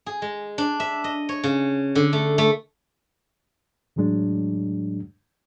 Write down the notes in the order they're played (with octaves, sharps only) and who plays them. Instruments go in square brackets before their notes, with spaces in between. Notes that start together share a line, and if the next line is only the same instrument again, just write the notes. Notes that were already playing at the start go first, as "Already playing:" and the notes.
[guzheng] G#4
G#3
D4
E5
D#5
C#5
C#3
D3
A3
A3
[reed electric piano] E2 A2 F#3 G#3 D4